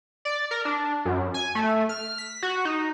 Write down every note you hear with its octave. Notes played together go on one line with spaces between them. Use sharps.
D5
A#4
D4
F#2
G#5
A3
F6
B6
F#4
D#4